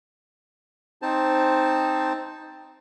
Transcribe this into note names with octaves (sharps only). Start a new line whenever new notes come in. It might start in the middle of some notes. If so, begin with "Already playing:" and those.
C4 D#4 C5 A5